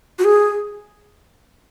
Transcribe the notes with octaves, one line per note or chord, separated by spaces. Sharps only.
F#4
G#4